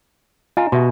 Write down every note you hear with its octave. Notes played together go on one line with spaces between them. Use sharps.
F4 D#5 G#5 A#5
B2 G4 E5 C6